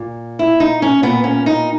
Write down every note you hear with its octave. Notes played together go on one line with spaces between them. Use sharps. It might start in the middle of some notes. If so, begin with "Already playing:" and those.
Already playing: A#2
E4
D#4
C#4
A#2 B3
C#4
D#4